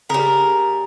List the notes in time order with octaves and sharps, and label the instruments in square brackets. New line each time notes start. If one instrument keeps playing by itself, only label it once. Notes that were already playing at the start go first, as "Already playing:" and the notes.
[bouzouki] C#3 G3 A#4